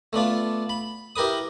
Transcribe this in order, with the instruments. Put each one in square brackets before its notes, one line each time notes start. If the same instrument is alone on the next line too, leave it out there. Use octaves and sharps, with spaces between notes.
[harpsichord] A3 B3 D4 F4
B5
E4 G4 A#4 B4 D#6